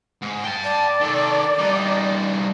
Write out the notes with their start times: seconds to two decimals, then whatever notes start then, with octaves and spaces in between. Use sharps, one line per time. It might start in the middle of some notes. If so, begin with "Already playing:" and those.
0.22 G#2
0.45 G5 A5
0.64 D5
1.00 D#3 A4
1.59 G2 D#4